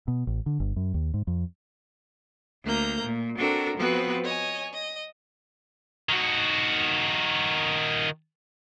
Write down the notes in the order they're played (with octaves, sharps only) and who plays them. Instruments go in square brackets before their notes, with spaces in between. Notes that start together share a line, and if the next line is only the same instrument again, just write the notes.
[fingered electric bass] B2
A1
D3
G1
F#2
D#2
G#2
F2
[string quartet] D2 A3 A#3 A#5 G6
A#2
C4 D4 F#4 A4 A#4
F3 B3 C4 F#4 B4
C#5 D#5 G#5
D#5
[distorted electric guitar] D#3 F#4